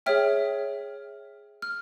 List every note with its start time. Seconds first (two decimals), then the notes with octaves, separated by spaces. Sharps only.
0.06 G#4 C#5 E5 G5 F6
1.62 F6